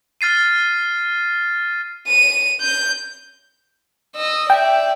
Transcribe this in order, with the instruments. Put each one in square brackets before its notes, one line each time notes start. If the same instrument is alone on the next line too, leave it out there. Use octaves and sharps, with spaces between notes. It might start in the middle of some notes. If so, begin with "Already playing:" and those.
[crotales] F6 A6 C7 D#7
[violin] D#7
G6
D#5 E6
[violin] D5 E5 [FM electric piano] G5